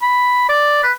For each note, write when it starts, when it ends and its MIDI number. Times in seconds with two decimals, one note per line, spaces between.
0.02 0.49 83
0.49 0.81 74
0.83 0.92 71